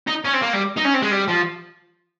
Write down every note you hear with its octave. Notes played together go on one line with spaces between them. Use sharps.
D#4
C#4
C4
A#3
G3
D#4
C#4
C4
G#3
G3
F3